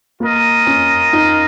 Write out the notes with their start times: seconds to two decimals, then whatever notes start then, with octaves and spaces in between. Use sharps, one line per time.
0.20 A#3 F4 A#4 D#5
0.67 C#4
1.13 D#4